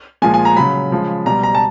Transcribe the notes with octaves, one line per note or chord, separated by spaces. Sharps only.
A#2 F3 G#3 G#5
G#5
A#5
C#3 F#3 B5
C#3 F3 G#3
B2 G3 A#5
A#5
A5